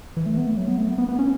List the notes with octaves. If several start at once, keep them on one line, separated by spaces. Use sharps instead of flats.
E3
A3
B3
A3
F#3
B3
A3
B3
B3
B3
C#4